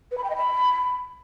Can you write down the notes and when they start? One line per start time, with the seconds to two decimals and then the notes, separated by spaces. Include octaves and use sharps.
0.11 B4
0.18 B5
0.24 G5
0.30 D#5
0.36 B5